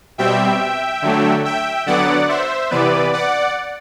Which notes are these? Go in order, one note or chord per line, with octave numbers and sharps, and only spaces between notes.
B2 G3 C4 E5 G5
D3 F#3 A3
E5 G5
D3 F#3 B3 D5 F#5
C5 E5
C3 E3 B3 B4 D5
D5 F#5